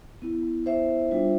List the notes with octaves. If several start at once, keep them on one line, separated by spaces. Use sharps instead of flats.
B3 E4
C5 E5
G3 D4 F4